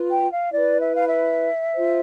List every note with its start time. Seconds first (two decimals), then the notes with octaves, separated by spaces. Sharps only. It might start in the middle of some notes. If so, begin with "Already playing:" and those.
Already playing: F4 B4
0.10 G5
0.31 F5
0.51 E4 B4 D5
0.82 E5
0.94 F5
1.08 E5
1.74 F4 C5